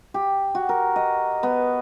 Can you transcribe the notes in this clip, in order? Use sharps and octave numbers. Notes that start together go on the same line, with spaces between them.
G4
F#4
A#4
D#5
B3